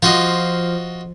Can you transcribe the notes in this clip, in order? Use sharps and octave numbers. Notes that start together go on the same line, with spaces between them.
F3 F4 F#4 D#5